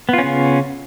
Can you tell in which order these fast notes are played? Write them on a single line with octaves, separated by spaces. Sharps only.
B3 F4 C#4 C#3